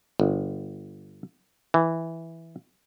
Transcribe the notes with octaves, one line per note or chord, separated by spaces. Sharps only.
G1
E3